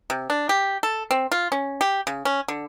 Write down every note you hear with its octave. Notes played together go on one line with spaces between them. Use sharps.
C3
D4
G4
A4
C4
F4
C#4
G4
C#3
C#4
D3